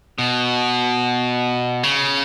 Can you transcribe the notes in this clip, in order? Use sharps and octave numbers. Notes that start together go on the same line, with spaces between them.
B2
C#3